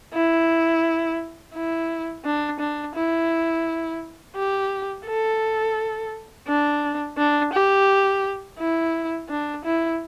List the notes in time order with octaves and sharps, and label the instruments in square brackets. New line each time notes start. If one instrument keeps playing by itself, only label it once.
[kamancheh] E4
E4
D4
D4
E4
G4
A4
D4
D4
G4
E4
D4
E4